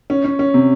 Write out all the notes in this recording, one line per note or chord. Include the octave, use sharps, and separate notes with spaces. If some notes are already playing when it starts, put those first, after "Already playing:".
C#4
C#4
C#4
C3